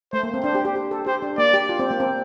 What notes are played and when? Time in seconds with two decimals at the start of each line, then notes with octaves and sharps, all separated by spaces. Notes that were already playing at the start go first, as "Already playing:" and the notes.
0.13 A3 C5
0.23 A#3
0.34 C4
0.44 D4 C5
0.55 G4
0.65 G4
0.76 G4
0.91 A4
1.07 G4 C5
1.22 D4
1.38 A#3 D5
1.54 G4
1.69 F4
1.79 C4
1.91 A#3
2.00 C4